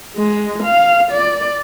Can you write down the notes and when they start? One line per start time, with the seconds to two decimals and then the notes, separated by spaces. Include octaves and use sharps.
0.17 G#3
0.63 F5
1.12 D5